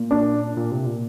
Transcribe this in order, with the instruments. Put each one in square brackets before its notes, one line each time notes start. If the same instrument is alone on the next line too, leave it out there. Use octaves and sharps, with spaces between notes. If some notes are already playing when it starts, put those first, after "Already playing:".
Already playing: [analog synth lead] A#2
[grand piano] D4
[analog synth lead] A#2
C3
A#2